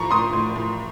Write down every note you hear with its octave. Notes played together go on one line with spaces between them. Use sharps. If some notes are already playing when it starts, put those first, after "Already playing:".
Already playing: A2 F3 A#5 C#6
A2 C6 D#6
A2
A2